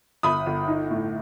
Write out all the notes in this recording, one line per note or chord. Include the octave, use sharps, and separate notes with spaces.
G1 B5 D#6
G1
D#4
A2